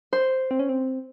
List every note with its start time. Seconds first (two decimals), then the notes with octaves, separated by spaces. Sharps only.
0.13 C5
0.51 C4
0.59 C#4
0.69 C4